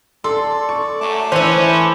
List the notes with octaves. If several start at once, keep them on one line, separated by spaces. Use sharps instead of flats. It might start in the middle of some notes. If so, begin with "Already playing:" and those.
A4 D5 C6
C#6
F#2 A3 A5 D6
E3 C#4 E4 C5